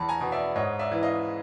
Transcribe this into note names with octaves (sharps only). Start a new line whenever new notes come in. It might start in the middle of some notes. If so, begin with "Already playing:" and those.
Already playing: E2 A5 B5
G#5 A#5
B2
D5 E5
G#2 C#5 D#5
D5 E5
E3
D#5 F5